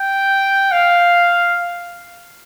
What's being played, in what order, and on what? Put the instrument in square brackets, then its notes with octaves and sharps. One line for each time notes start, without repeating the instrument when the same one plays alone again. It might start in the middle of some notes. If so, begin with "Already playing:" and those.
Already playing: [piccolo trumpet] G5
F5